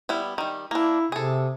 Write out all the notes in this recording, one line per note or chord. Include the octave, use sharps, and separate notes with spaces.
G3 B3 E4
D#3 G3
A#3 D4 E4
C3 G#4 A4